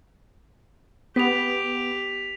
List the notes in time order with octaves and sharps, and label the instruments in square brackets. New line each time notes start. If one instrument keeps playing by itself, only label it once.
[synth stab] B3 [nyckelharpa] G4 [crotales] B6 F7